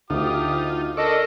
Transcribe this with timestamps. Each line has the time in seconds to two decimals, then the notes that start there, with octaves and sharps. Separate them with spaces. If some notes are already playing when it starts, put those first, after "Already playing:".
0.10 D2 D#4 F4 G4 D#6
0.97 D4 A4 A#4 D5 D#5 C#6